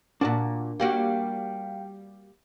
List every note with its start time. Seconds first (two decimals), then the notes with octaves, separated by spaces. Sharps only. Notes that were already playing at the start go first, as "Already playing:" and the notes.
0.21 A#2 D4 F#4 A#4 A5
0.80 G3 A#3 F#4 F5 G5